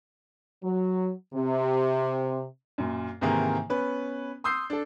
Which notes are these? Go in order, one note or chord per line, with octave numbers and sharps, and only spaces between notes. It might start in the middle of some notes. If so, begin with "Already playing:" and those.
F#3
C3
F#2 A#2
G#2 C3 D#3 E3 A#3
B3 C#4 B4
C6 D#6 E6 G6 C7
D4 A4